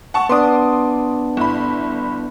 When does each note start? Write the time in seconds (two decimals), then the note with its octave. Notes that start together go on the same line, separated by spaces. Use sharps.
0.14 F#5 A5 C#6
0.29 B3 D4 C6 D6 D#6
1.37 G1 E4 B5